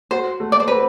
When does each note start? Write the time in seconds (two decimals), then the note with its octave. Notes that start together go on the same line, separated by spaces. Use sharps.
0.11 F#4 C5
0.40 A3
0.52 D5
0.60 C5
0.68 C4 B4